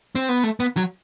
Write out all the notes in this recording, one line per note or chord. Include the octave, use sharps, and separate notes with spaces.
C4
B3
A3
B3
F#3